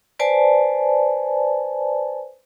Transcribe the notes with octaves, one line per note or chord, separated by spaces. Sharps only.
B4 C5 D5 G#5 A5